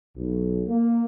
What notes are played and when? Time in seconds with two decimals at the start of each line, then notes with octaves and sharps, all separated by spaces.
0.16 B1
0.67 A#3